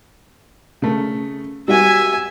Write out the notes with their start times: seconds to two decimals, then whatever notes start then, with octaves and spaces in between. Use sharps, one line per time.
0.82 C#3 A3
1.68 G3 F#4 E5 G#5